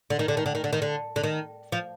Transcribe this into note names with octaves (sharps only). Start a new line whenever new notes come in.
D3
D#3
D3
D#3
D3
D#3
D3
D#3
D3
D3
D#3
F3